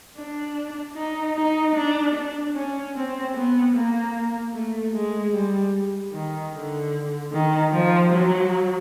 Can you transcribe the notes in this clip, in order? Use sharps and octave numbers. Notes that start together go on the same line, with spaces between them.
D4
D#4
D#4
D4
D4
C#4
C4
B3
A#3
A3
G#3
G3
D#3
D3
D#3
F3
F#3